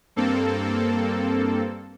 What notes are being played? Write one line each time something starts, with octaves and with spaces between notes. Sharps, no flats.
G2 A#3 C4 A4